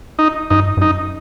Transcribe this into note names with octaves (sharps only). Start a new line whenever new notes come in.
D#4
G2 D#4
G2
F#2 D#4